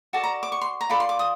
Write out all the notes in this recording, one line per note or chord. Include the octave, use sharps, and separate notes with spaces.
F#4 A4 D5 A5
A#5
D6
C#6
C6
A#5
F4 A4 D5 B5
C6
D6
D#6